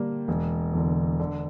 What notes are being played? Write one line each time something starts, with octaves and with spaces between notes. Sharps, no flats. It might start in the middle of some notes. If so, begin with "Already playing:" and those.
Already playing: D3 G3 A#3
E1
E2 D3
D3